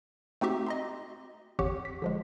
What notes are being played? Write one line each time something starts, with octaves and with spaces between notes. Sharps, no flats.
A3 C4 D#4 F#4 G4 E5
D#5 A#5 C6
G#1 F2 G4 C#5 F#5 C#6
B6
D3 F3 G#3